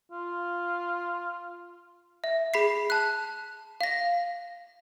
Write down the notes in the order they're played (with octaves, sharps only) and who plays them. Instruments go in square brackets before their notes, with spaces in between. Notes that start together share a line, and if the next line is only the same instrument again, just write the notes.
[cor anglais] F4
[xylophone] E5
G#4 B5 B6 C7
A5 F#6
F5 A#6